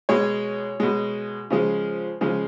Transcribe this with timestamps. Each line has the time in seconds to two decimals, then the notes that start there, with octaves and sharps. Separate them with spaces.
0.09 B2 G#3 C#5
0.80 B2 G#3
1.50 C#3 F3 G#3
2.21 C#3 F3 G#3